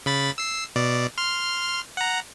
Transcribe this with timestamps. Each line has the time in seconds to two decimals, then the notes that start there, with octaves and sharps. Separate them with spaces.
0.06 C#3 B5 A6
0.38 E6 C7
0.76 B2 D5
1.18 C6 F6
1.97 F#5 A#5